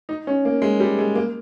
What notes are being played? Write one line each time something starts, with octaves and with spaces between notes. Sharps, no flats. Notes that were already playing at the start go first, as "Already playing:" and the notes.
D#4
C#4
A#3
G#3
G3
G#3
A#3